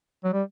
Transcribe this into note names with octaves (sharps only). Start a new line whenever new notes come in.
F#3
G3